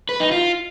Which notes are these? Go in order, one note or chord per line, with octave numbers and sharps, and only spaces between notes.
B4
D#4
F4